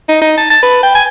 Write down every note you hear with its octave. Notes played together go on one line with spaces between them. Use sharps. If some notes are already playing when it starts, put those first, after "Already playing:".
D#4
D#4
A5
A5
B4
G5
G#5